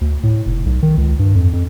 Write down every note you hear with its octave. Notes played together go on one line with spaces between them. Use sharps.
D2
A2
F1
B1
D#3
C#2
G2
F2
F2